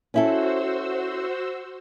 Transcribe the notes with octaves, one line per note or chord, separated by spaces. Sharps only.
C#4 E4 F#4 A4 C5 E6